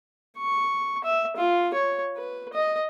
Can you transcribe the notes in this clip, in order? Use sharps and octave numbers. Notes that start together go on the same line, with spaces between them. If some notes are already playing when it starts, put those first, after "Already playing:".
C#6
E5
F4
C#5
B4
D#5